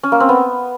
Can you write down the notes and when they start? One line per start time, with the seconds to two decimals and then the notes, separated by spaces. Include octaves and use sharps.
0.03 C#4
0.12 A#3
0.20 C4
0.29 B3